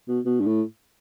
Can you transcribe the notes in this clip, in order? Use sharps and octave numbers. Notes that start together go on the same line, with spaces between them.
B2
B2
G2
A2